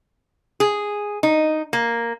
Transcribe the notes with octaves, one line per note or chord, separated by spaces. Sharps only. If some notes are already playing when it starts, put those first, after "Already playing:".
G#4
D#4
A#3